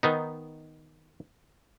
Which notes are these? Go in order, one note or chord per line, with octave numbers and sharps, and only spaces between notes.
D#3 B3 D#4